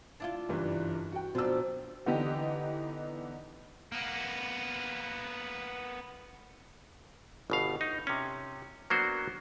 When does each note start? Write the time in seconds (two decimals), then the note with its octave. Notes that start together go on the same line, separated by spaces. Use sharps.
0.20 D4 E4 F4
0.49 F#1 G2 E3
1.12 F#4 G5
1.35 B2 F3 F#3 D4 E6
2.06 D3 E3 B3 D#4 G4
3.92 A#3 B3
7.50 G1 B2 F5
7.81 D#4
8.07 C3 C#4
8.90 F#3 A#3 B3 D4 F#4 C5